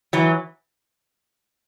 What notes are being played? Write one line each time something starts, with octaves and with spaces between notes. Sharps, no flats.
E3 F#3